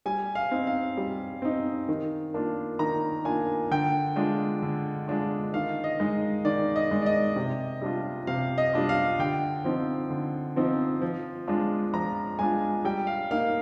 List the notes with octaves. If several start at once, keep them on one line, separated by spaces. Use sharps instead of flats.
G3 G#5
F5
C4 D#4
F5
G3
C4 D#4
D#3
A#3 D4 F4
D#3 A#5
A#3 D4 F4 G#5
D3 G5
G#3 D4 F4
D3
G#3 D4 F4
D#3 F5
D#5
G#3 D#4
D#3 D5
D#5
G#3 D#4
D5
D#5
C3
G3 D4 F4
C3 F5
D#5
G3 D4 F4
F5
D3 G5
F3 C4 D#4
D3
F3 C4 D#4
F3
G#3 D4 F4
F3 A#5
G#3 D4 F4 G#5
G3 G5
F5
A#3 D#4 F5